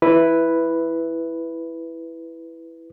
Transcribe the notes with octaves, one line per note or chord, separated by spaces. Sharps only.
E4 B4